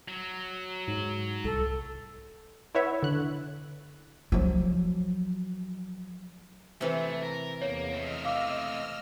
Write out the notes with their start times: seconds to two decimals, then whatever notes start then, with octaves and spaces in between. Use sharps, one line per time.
0.08 F#3
0.88 G#2
1.45 C2 A4
2.75 E4 B4 C#5 E5 F#5
3.03 D3 F#6
4.32 F3 F#3
6.81 C3 E3 A3
7.23 A#4
7.61 E2 A#3 C#5
7.92 A3 C4 D#5 E6 F6
8.25 F5 D6